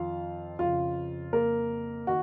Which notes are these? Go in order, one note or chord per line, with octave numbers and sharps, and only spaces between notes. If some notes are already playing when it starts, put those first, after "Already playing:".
Already playing: F2 D#3 F4 F5
F2 C#3 F4 F5
A#3 A#4
D#3 F#4